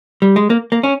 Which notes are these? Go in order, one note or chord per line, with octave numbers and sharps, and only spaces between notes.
G3
G#3
A#3
A#3
C#4